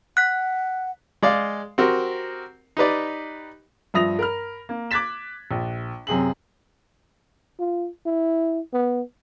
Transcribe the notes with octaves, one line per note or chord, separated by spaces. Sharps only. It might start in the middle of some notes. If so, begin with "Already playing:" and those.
F#5 F#6 B6
G#3 D5 F5
C4 F#4 G4 A#4
D#4 G4 B4 D5
G2 F3 E5 D#6 A#6 F7
A#4 B5 F6
A#3
D6 F#6 G#6 A6 B6 E7
A#1
F#2 C3 G#4 F#7
F4
E4
B3